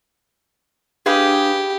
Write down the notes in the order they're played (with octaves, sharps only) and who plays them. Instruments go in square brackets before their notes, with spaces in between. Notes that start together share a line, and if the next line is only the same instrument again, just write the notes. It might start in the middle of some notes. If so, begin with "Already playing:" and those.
[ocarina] D4 [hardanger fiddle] G4 [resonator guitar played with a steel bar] G#4 B4 F5